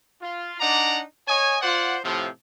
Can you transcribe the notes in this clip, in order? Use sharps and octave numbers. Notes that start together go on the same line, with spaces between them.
F4
D4 D#4 D5 F#5 A#5
C#5 D#5 G#5
F4 C5 D5 F#5
A2 C3 F3